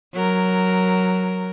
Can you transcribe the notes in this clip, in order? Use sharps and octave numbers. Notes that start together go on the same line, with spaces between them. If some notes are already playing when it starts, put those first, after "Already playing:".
F#3 A#4